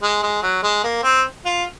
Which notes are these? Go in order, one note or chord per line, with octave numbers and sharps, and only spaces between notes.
G#3
G#3
F#3
G#3
A#3
C4
F4